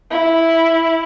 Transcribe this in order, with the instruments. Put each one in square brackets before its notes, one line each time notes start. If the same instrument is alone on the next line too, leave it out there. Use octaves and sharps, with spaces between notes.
[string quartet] E4